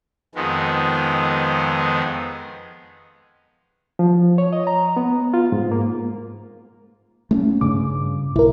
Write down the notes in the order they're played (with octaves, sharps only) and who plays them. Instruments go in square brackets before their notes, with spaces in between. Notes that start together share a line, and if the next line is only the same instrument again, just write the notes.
[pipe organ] F2 D#3 G#3 B3
[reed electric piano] F3
C#5
D#5
A#5
B3
F4
G#2
A#3
[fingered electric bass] A3 C4 C#4
[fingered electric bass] G2 C#3 [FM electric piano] D6
[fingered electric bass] B1 [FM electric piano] E4 A#4